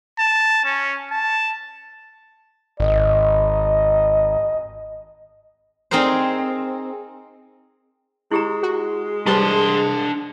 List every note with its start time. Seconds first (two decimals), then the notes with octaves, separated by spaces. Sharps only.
0.19 A5
0.65 C#4
1.11 A5
2.80 G#1 D#5
5.91 C4 D#4 G#4 A#4 C5
8.31 G#3 E4 G4 A#5
8.63 F#4
9.26 G3 D4 G4 B4 C5 A5 C6